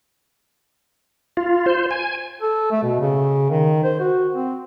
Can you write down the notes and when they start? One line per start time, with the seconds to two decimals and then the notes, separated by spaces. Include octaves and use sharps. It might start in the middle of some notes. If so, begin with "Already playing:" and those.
1.37 F4
1.66 C5
1.91 G#5
2.42 A4
2.71 A3
2.83 B2
3.00 C#3
3.50 D#3
3.84 C5
4.00 F#4
4.35 C4